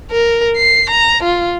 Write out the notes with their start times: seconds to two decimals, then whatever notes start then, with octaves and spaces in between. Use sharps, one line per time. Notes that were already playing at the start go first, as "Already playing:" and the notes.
0.12 A#4
0.57 C7
0.90 A#5
1.23 F4